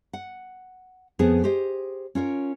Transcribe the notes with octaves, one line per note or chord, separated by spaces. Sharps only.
F#5
F2 B3 G#4
G4 G#4 C5 D#5
C#4 F4 A#4 C#5